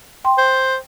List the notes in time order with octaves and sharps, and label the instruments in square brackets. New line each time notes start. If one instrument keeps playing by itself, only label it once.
[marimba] G5 C6
[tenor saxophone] C5